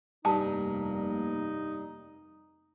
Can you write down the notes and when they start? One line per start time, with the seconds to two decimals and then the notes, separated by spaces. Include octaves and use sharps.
0.25 F1 G2 G3 A#3 D#4 A5